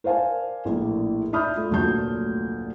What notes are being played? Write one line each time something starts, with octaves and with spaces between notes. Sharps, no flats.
A#4 C5 D5 F5 G#5 A5
A#1 A2 A#3
D5 E5 B5 D#6 F6 G6
A3 F4
F1 D2 A#2 F#3 A5 G6